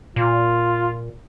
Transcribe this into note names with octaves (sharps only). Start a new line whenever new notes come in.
A#2 F4